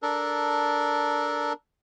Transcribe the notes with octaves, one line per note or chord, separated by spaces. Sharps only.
D4 A4 A#4